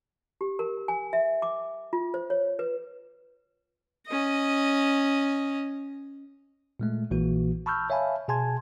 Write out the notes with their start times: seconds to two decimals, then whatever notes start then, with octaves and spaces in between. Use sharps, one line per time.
0.41 G4
0.59 A#4
0.88 G#5
1.13 E5
1.42 D6
1.93 F4
2.14 C5
2.30 C#5
2.59 B4
4.07 C#4 D#5
6.80 A#2 G#3 A3
7.11 A#1 A#2 E3 A#3 F#4
7.66 A5 B5 C#6 E6 F6 G6
7.90 C#5 E5 F5 G#5 A5 B5
8.28 B2 G#4 G#5 A5 C6 G#6